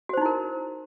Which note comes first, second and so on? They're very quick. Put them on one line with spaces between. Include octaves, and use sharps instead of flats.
F#4 C5 D#4 E4 A#4